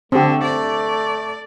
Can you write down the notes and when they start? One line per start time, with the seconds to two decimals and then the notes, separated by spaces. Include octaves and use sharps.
0.12 D3 A3 C4 G4
0.43 D5